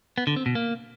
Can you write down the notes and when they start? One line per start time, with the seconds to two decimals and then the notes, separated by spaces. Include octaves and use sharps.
0.18 B3
0.27 D3
0.36 C4
0.46 B2
0.55 A#3